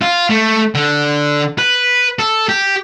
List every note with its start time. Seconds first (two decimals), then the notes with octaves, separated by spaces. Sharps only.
0.02 F4
0.30 A3
0.75 D3
1.58 B4
2.19 A4
2.49 G4